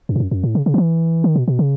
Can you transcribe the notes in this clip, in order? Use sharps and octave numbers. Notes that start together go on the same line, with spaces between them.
F#2
G#2
F#2
F#2
A2
C#3
C#3
D#3
E3
D#3
B2
B2
C#3